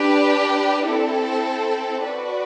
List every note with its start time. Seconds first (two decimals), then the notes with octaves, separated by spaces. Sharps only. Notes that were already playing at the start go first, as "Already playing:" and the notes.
Already playing: D4 G4 B4
0.87 C4 E4 A4
2.04 F#4 B4 D5